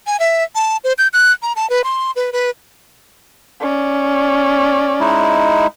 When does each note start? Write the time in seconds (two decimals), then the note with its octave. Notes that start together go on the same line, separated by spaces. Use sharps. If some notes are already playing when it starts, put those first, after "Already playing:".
0.07 G#5
0.20 E5
0.55 A5
0.84 C5
0.98 G6
1.13 F#6
1.42 A#5
1.56 A5
1.70 B4
1.84 C6
2.16 B4
2.33 B4
3.60 C#4 D5
5.00 G#3 D#4 E4